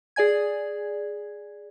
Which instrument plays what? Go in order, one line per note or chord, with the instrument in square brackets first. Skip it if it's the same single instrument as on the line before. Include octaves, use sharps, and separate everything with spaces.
[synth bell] G#4 D5 G#5 G#6